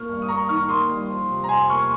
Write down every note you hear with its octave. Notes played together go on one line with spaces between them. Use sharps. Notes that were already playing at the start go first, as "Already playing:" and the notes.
Already playing: A#2 A#3 C#6 F6
G2
D#6
A#3 A#5 C#6
D#3 C#6 F6
A#3 C6 D#6
G3
F3
C3
A#5
F2 G#5 C6
A#3 C#6 F6